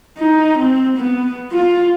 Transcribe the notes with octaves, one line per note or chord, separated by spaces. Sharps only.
D#4
C4
B3
F4